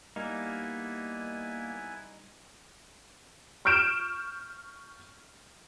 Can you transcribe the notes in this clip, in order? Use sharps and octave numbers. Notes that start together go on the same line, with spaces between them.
G3 A#3 B3 D#4 E4 G#5
C#6 F6 G6 D7 E7